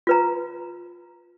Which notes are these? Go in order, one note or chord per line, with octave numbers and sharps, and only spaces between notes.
F4 B4 A#5